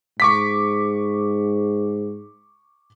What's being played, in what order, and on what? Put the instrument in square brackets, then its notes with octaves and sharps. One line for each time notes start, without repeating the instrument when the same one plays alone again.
[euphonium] G#2 [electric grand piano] C#6 D6 B6